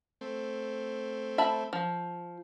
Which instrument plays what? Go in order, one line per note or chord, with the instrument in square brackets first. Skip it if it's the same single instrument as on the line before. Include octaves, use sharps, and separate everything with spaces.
[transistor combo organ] A3 C4
[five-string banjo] E5 A5 B5
F3